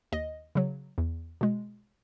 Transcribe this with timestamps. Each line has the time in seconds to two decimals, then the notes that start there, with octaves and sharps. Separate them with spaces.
0.12 D#2 D#5
0.55 C#3 F#3
0.98 E2
1.41 B2 G#3